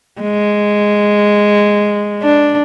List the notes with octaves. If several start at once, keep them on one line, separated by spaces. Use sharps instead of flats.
G#3
D4